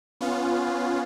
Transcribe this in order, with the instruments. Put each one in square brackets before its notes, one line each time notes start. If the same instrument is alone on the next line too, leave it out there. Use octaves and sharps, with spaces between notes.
[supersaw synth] B3 C#4 F4